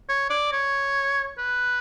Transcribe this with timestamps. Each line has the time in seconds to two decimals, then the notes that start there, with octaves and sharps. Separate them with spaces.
0.09 C#5
0.30 D5
0.52 C#5
1.38 B4